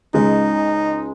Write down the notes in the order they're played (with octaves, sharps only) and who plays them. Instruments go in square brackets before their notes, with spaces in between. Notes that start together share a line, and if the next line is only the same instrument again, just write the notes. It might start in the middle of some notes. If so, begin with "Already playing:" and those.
[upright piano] C#2 C#3 G#3 [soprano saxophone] D#4